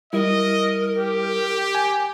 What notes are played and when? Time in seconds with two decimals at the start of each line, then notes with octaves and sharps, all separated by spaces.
0.13 G3 E4 A#4 D#5
0.98 G4
1.75 G#5